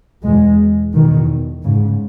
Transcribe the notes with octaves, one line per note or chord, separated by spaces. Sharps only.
E2 B2 G#3
E2 B2 D#3
G#2 C#3